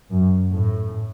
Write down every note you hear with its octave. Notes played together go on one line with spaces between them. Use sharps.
F#2
A2